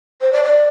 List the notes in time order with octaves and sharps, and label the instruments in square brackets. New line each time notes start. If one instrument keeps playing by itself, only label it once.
[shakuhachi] C5
D5
D5